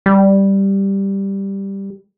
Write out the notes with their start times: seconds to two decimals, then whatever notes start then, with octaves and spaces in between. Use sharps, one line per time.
0.06 G3